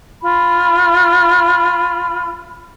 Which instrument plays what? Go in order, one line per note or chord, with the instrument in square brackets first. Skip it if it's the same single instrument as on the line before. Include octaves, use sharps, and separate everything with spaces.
[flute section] F4 B5